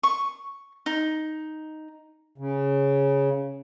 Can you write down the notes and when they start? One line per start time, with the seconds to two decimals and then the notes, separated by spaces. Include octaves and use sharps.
0.03 C#6
0.86 D#4
2.38 C#3